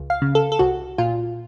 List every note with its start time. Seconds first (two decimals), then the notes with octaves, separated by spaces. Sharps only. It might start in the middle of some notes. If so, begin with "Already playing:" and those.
Already playing: C#2
0.10 F5
0.22 C#3
0.35 A4
0.52 A4
0.59 C2 F#4
0.98 A#2 F4